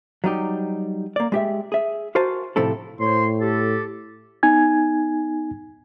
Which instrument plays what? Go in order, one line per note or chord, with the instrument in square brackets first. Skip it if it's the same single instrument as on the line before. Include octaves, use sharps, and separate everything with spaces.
[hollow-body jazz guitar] F#3 G3 D#4 G4
A#3 D5
G#3 G4 E5
G#4 E5
F#4 A#4 C5 G#5 A5
A2 C3 F3 A3 E4 A4
[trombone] A2 [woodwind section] C5 C#5 C6
[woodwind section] G4 A4
[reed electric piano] B3 D#4 G#5 G#6